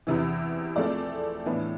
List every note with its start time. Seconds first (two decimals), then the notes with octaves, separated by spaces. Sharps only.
0.07 E2 C3 E3
0.76 F3 A3 C4 G#4 D5
1.46 A2 E3 B3 D4